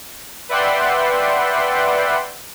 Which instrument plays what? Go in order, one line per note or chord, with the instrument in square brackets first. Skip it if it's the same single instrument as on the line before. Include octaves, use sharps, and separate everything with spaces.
[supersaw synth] B4 D5 E5 F#5 G5 C6